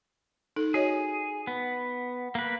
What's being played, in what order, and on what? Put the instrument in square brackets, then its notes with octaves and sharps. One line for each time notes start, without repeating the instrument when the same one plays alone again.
[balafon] D#4 A4
[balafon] F#4 C#5 D#5 [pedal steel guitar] G#4
[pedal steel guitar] B3
A#3 B4